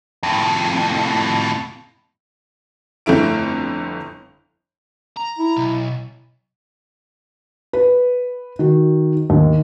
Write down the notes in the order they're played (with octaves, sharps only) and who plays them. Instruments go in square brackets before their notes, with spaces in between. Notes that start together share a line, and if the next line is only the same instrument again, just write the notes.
[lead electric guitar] F2 A2
[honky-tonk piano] G1 F2 A3 E4 D7
[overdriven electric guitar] A#5
[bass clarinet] E4
[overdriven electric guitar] B1
[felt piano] B4
D#3 F#4
D#2